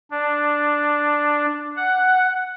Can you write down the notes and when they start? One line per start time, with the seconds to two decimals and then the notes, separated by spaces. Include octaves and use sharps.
0.11 D4
1.77 F#5